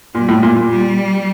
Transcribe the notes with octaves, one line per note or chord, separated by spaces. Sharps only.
A#2 G3
A2
A#2
A#2
G3